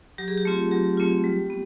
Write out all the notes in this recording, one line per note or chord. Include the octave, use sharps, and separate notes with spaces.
F#3 G4
G#4
G4
A3 C4 F4
F#3 G4
A3 C4 F4
G3
B3